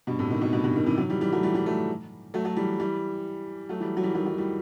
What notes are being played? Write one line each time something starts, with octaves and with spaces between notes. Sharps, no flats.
G2 B2
A2 C3
B2 D#3
B2 D#3
G2 B2
G2 B2
B2 D#3
C3 E3
D#3 F#3
E3 G3
E3 G3
F#3 A3
E3 G3
E3 G3
F#3 A3
F#3 A3
F#3 A3
E3 G3
E3 G3
F#3 A3
E3 G3
F#3
E3 G3
D#3 F#3
D#3 F#3
E3 G3